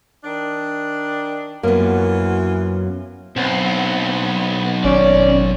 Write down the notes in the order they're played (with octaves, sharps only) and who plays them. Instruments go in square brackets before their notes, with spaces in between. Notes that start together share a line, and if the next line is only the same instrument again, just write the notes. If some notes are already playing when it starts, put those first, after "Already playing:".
[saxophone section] D#3 D4
[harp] F#2 [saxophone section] E3 F4 F#4 [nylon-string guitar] A#3 B3
[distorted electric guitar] B1 [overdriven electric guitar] B3 C4
[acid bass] G#1 [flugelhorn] C#4 [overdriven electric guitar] D5